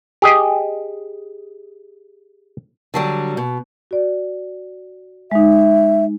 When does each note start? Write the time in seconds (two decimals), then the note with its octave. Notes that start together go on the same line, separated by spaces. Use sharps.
0.22 G4 G#4 D#5
2.94 D3 F#3 G3
3.37 B2
3.91 F#4 D5
5.31 G#3 D#4 E5